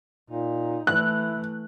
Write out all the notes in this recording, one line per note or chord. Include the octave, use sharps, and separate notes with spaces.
A#2 D#4
E3 A3 E4 F#6